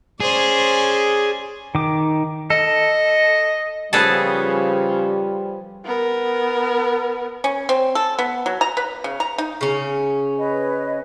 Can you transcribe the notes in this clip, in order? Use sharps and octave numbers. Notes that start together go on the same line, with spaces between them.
C#4 G#4 C5 D5
D#3 D6
A4 D#5
C#3 F3 G3 B3 G#4 A4
B3 A#4
C#4
C4
A4
B3
F#3
A#5
B4
C#3
A#5
D#4
C#3 C#4
B4 C#5 D#5